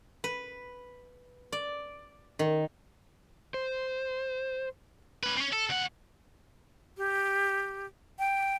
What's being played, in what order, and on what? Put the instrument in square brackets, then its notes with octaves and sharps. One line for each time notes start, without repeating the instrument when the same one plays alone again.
[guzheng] B4
D5
D#3
[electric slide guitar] C5
[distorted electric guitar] C#4 B4
C4 C#4
A4
D2 F#5
[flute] G4
G5